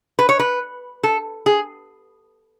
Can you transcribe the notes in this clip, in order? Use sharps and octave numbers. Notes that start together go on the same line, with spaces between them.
B4
C#5
B4
A4
G#4